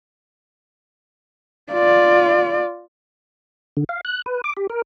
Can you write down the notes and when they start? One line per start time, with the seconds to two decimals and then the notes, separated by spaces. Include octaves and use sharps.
1.73 F4 D5
3.77 D3
3.89 F5
4.05 F#6
4.26 B4
4.44 D6
4.57 G4
4.70 A#4